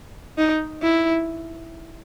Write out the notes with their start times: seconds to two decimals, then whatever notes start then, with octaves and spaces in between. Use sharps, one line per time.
0.38 D#4
0.82 E4